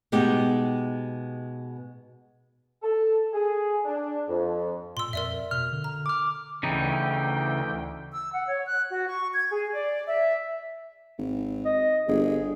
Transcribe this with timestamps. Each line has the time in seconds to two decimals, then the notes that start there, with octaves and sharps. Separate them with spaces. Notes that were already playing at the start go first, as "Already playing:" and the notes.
0.12 B2 G#3 B3 D#4 G4
2.83 A4
3.34 G#4
3.85 D4
4.28 F2
4.97 A#2 C6 E6
5.13 F2 A#4 D5 E5
5.51 B2 F6
5.72 D3
5.84 A#5
6.06 D6 F6
6.63 D2 C#3 E3 D#4 G5
8.12 E6
8.33 F#5
8.48 C#5
8.66 F#6
8.92 F#4
9.08 C#6
9.33 G#6
9.51 G#4
9.74 D5
10.06 E5
11.19 G#1
11.65 D#5
12.08 G1 G#4